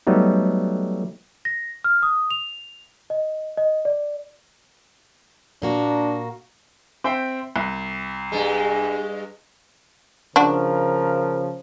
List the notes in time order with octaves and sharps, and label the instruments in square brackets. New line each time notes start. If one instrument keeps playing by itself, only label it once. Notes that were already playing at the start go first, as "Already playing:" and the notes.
[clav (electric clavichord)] F#3 G3 A3 B3 D#4
[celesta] A#6
F6
D#6
F7
D#5
D#5
D5
[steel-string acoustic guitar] A#2 A#3 F#4 [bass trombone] D4
[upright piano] C4 E5 G5
C2
[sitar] G2 G#3
[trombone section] C#3 F3 A#4 [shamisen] D4 F#4